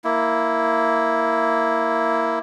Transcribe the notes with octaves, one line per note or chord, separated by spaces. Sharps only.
A#3 E4